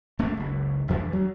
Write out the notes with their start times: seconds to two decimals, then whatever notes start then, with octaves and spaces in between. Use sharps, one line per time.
0.19 G#1 A3 A#3 D4
0.37 F#1 C#2
0.88 F#1 F2 E3 D4
1.10 D2 F#3